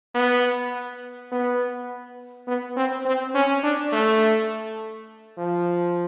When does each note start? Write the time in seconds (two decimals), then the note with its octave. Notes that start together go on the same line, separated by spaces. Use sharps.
0.15 B3
1.32 B3
2.48 B3
2.77 C4
3.06 C4
3.35 C#4
3.63 D4
3.93 A3
5.38 F3